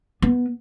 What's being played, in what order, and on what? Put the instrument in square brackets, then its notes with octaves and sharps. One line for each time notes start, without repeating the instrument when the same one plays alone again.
[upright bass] B3